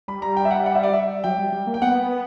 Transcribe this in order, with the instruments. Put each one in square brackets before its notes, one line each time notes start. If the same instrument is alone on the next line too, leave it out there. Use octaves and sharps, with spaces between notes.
[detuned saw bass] G3 [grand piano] B5
[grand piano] A#5
G5
E5
F#5
F#5
E5
D5
E5
[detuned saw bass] F#3 [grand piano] G5
[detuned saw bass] G3
G3
A#3
[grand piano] G5
[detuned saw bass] B3 [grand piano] F#5